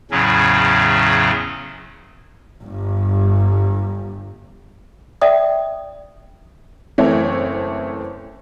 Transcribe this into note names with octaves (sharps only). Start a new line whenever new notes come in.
E2 A2 C#3 F#3 C#4
G1 G2
D5 E5 G5 D#6
F#1 E3 A3 C4 C#5